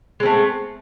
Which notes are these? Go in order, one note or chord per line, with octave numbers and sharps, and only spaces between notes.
G#3 A3 C4